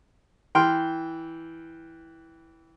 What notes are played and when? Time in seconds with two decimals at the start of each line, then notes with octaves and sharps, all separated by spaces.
0.55 E3 G5 C6 F6